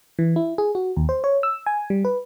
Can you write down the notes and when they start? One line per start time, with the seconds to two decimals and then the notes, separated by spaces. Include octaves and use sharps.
0.19 E3
0.36 E4
0.58 G#4
0.75 F#4
0.97 D#2
1.09 C5
1.24 C#5
1.43 E6
1.67 G#5
1.90 G3
2.05 B4